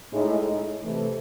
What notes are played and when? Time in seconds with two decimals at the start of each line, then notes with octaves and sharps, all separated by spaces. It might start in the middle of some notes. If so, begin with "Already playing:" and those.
0.12 A2 G#3 D#4
0.82 C3 E3 A3